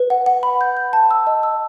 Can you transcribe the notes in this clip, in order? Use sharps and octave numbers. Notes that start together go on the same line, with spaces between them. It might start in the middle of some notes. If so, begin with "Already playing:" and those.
Already playing: B4
F#5
F#5
B5
G6
G6
A5
E6
D#5
E6